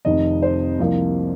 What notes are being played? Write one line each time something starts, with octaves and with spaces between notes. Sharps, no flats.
F1 F2 D#3 D#5
C5
C2 C3 F3 A#3